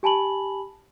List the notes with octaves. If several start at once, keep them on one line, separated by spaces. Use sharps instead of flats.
G4 G#5 A5 B5 F#7